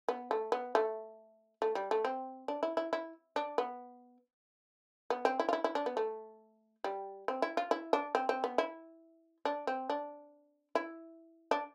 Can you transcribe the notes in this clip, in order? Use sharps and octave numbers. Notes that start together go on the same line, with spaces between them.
B3
A3
B3
A3
A3
G3
A3
C4
D4
E4
E4
E4
D4
B3
B3
C4
E4
F4
E4
E4
D4
B3
A3
G3
C4
E4
F4
E4
D4
C4
C4
B3
E4
D4
C4
D4
E4
D4